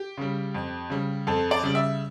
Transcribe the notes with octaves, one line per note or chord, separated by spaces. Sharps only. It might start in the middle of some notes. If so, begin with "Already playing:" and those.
Already playing: G4
C#3 G3
F2
C#3 G3
F2 A4
D5
C#3 G3
E5